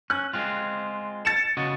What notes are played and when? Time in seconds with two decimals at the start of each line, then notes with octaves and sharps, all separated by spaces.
0.10 C#4 F#6
0.33 G#3 C4 F4
1.25 A6 C#7 E7
1.57 C#3 F#4 D#5